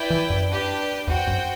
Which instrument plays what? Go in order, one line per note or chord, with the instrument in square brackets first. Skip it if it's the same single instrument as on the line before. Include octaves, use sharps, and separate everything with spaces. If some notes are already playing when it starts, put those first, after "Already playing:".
Already playing: [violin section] E4 B4 D5 G5
[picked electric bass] E3
F#2
[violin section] D4 G4 B4
[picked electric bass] E2 [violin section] F#4 C5 G5
[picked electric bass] F#2